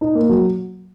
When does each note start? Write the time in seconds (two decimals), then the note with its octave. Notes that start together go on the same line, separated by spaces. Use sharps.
0.01 D#4
0.15 A#3
0.29 F#3